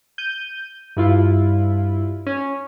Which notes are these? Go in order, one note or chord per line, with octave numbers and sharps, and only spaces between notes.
G6 D#7
G2 E4 F4
C#4